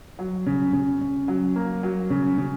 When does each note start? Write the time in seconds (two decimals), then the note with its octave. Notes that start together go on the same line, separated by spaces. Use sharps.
0.19 F#3
0.46 C#3
0.73 C#3
1.01 C#3
1.28 F#3
1.56 A#3
1.83 F#3
2.10 C#3
2.38 C#3